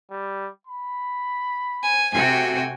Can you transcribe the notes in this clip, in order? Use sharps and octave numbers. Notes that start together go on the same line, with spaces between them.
G3
B5
G#5
C3 A3 F#4 G5 G#5